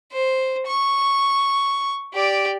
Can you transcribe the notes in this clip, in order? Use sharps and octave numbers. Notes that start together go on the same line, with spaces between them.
C5
C#6
G4 D5